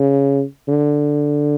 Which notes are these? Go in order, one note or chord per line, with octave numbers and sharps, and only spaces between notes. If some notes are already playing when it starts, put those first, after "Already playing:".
Already playing: C#3
D3